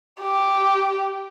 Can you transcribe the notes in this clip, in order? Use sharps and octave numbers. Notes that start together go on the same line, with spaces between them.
G4